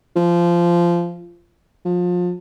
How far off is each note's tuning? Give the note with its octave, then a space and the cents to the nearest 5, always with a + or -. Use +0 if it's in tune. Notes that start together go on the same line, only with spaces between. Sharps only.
F3 -15
F3 +30